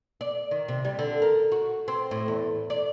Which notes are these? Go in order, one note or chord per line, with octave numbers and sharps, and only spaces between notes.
D5
D#3
C3
G3
D3
A#4
F#4
C4
A2
E2
D5